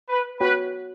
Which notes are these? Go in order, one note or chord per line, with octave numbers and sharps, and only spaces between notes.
B4
F#4 B4 C#5 G5